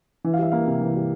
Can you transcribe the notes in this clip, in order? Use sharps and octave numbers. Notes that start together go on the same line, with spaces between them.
E3
F5
G3 E5
A#3 F5
C3
E3
G3